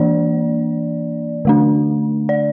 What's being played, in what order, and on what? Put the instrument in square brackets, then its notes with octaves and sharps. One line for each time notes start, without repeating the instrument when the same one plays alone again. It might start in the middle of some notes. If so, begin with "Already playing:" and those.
Already playing: [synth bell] E3 A#3 D4 D5
D3 A3 D4
D5